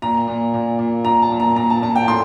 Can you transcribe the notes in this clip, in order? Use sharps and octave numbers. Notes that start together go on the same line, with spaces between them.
A#2 A#5
A#2
A#2
A#2
A#2 A#5
A5
A#2
A#5
A#2 A#5
A5
A#2 A5
G5
A2 C6